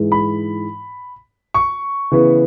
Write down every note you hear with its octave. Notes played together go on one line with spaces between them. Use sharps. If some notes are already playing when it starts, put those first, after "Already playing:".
Already playing: G#2 E3 G#3
B5
C#6
C#3 E3 B3